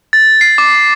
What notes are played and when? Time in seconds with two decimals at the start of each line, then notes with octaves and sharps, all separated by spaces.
0.13 A6
0.41 C7
0.58 D6